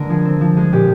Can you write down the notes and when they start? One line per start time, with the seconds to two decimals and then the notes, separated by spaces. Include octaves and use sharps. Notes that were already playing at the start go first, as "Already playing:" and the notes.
Already playing: D3 G#3 A#3 A#4
0.09 F3 G#4
0.25 C4
0.41 F3
0.57 G#3 G#4
0.73 A#2 G4